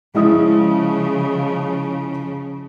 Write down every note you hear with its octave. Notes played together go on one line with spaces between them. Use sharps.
C#3 F3 G#3 E4 D#6